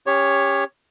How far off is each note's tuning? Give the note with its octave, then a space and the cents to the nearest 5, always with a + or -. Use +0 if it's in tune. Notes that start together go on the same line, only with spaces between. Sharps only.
C#4 +0 G4 +25 C#5 +0